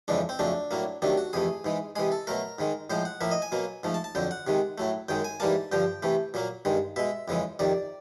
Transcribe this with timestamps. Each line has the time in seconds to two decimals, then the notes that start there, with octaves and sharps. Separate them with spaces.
0.08 F2 C#3 E3 G#3 D4
0.29 C4
0.39 F2 C#3 F#3 A3 D4
0.71 A2 F#3 A#3
1.02 C3 D#3 F#3 A3 D4
1.17 F#4
1.33 F2 C3 E3 A3 G#4
1.65 G#2 E3 G#3
1.96 C3 E3 G#3 G#4
2.12 A4
2.27 B2 F#3 A3 A#4
2.59 G#2 D#3 G#3
2.90 A2 F3 G#3 C5
3.05 F#5
3.21 A2 F3 A#3 E5
3.31 D#5
3.42 G#5
3.52 B2 F#3 A#3
3.83 G#2 F3 A3
3.94 A5
4.04 A5
4.15 F2 D3 F#3 G5
4.31 F#5
4.47 C3 D#3 G#3
4.78 A2 F#3 A3
5.09 F#2 D#3 G#3 G5
5.25 G#5
5.40 G#2 E3 G3 A#3 A5
5.72 G2 D3 F3 G5
6.03 C3 E3 A3
6.34 A#2 F#3 A#3
6.65 G2 D#3 G#3
6.96 B2 G#3 E5
7.28 F2 C#3 E3 G#3
7.59 F2 C3 D#3 D5